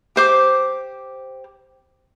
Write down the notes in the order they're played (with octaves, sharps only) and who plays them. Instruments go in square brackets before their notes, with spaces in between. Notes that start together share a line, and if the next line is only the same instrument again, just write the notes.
[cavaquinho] G4 C5 D6